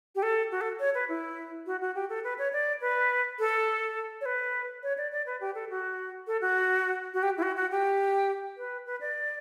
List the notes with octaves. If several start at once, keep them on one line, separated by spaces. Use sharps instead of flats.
G4
A4
F#4
A4
C#5
B4
E4
F#4
F#4
G4
A4
B4
C#5
D5
B4
A4
C#5
B4
C#5
D5
D5
B4
G4
A4
F#4
A4
F#4
F#4
G4
E4
F#4
F#4
G4
B4
B4
D5